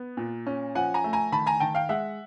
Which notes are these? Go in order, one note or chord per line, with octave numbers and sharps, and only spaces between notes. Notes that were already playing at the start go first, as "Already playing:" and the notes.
Already playing: B3
A#2
C#4
F3 F#5 G#5
G#5 A#5
A3
G#5 A#5
D#3 A5 B5
G#5 A#5
D#3 G5 A5
F5 G5
G#3 E5 F#5